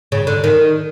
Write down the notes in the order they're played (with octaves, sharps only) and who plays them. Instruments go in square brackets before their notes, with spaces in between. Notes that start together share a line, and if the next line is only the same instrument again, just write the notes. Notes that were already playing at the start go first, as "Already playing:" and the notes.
[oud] C#3
D3
D#3